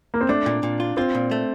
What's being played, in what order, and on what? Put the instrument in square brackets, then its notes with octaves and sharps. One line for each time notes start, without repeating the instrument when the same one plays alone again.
[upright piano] A#3
C4
[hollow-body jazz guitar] A3 [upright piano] D4
[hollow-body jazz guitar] A#2
A#2
F4
[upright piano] C4 [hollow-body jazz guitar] F4
[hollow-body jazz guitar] A#2
A3